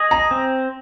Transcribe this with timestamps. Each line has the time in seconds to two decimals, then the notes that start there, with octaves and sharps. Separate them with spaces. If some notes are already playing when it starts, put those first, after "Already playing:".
Already playing: G#4 D#5
0.11 A#5
0.31 C4